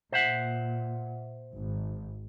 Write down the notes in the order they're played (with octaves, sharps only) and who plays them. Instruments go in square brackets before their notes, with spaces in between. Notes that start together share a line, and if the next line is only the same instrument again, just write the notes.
[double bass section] A#2 [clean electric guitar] C5 E5 F#5
[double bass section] G#1